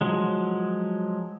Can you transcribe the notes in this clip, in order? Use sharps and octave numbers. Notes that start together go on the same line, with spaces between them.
F3 F#3 G#3